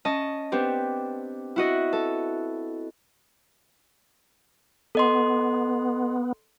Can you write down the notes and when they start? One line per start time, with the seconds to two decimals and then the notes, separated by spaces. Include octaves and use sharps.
0.05 C#4 D#5 A5
0.52 B3 C4 D4 G4
1.56 E4 F#4 D#5
1.93 A4
4.95 B3 A4 D#5 C6